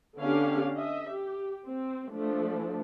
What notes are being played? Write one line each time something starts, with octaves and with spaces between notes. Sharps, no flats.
D3 B3 C#4 D4 G4 F5
D#5 E5
G4
C4
F3 A3 D4